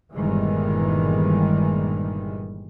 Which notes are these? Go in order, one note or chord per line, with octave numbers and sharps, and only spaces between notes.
G1 A#2 D#3 E3 G3 G#3